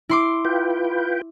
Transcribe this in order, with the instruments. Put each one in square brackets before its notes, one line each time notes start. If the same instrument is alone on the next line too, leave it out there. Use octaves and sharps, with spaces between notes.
[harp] E4 C6 D6
[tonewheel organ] F4 B4 G5